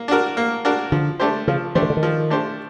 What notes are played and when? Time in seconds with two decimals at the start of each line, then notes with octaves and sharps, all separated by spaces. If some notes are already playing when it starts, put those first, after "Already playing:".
Already playing: A#3
0.08 D4 F#4 A#4
0.37 A#3
0.65 D4 F#4 A#4
0.92 D3 F3
1.20 A3 D4 G4 C5
1.47 C#3 F3
1.75 E3 A3 D4 G4 C5
1.82 D#3
1.90 D3
1.97 D#3
2.03 F3
2.30 A3 D4 G4 C5